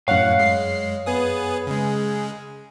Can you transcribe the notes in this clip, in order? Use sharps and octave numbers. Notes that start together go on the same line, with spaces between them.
F#2 A2 C#5 F5 F#5
G#3 C7
B3 G#4 B4 D#6
C#3 G#3